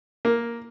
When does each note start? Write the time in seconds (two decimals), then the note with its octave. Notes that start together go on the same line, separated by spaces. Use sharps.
0.25 A#3